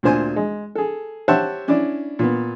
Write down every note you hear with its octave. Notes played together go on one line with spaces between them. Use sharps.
D2 A#2 D4 C5 G#5
G#3
G#4 A4
G4 C5 C#5 E5 F#5 A5
C#4 D4 E4 D5
A#2 B3